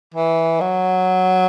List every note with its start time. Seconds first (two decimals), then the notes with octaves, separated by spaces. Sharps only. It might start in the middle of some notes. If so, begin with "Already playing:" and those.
0.15 E3
0.61 F#3